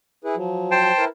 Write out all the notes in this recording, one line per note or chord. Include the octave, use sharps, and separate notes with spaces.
E4 G#4 B4
F3 F#3
C5 G5 A5
E4 A#4 B4